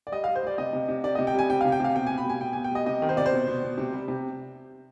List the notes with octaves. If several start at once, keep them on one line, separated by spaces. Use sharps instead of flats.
D5
G3 D#5
F5
G3
C5
G3 D5
C3 D#5
C3
C3
C3 D5
D#5
C3
G5
G3 G#5
C3 G5
F5
C3
G5
C3 F5
B2 G5
G#5
B2
B5
G3 G#5
B2 G5
G#5
B2
G5
G3 D#5
C3 D#5
D#3
C5
C3 D5
C5
B2
B2
B2
C3
G3
C3